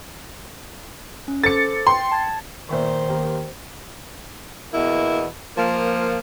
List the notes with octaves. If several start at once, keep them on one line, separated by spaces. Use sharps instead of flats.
C#4
A4 C5 D6 A6 C#7
G5 C6
A5 G#6 A6
A#2 D#3 C5 E5 C#6
D#2 A#3 G4
E2 B2 A#3 E4
F3 A#3